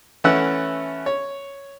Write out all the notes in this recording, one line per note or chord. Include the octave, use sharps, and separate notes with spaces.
E3 A3 C#4 E5 F#5
C#5